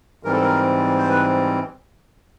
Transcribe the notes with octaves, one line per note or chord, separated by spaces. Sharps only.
G#2 E3 G3 C4 A#4
A4
A#4
C5
B4